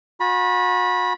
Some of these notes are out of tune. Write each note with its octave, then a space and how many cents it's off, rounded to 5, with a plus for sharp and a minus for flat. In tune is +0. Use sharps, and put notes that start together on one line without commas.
F#4 -40 G#5 +0 B5 -25